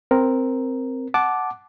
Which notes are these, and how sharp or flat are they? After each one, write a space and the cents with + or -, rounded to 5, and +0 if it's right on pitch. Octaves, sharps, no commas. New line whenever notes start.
C4 +0 A#4 +0
F#5 +0 A5 -15 D6 +0